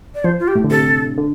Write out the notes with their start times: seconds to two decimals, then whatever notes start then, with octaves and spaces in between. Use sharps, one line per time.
0.15 D5
0.24 F3 C5
0.40 F4
0.48 G4
0.55 A2
0.64 D3
0.71 C3 A4
1.18 D3